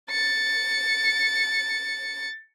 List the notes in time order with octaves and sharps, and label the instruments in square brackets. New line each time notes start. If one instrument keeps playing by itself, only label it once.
[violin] A6 C#7